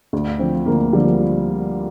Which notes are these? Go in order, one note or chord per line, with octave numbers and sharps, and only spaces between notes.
D2
D3 F3 C4
D2 A#3
D3 F3 G3